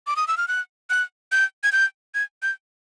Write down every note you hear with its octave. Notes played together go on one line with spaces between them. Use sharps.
D6
D#6
E6
F6
F#6
F#6
G6
G#6
G6
G#6
G6